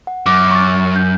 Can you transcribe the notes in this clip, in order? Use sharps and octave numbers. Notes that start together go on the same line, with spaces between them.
F#5
F#2 D6
C#6 A6
G6